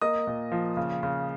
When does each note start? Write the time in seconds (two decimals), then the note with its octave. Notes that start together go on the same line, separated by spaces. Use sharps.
0.02 A#3 D#5 D#6
0.27 A#2
0.52 F3
0.77 C#3
1.03 C#3